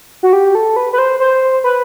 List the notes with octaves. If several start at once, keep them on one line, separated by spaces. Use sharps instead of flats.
F#4
G4
A4
B4
B4
C5
C5
B4